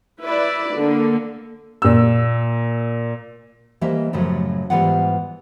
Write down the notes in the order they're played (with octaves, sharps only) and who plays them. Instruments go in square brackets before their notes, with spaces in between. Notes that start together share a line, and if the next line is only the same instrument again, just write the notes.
[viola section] E4 B4 D5
D3 A#3
[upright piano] A#2 E6
[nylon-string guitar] E3 G3 A#3 C5 D#5 E5
F#2 A2 C#3 F3 F#3
G#2 E3 G3 B3 F4 F#5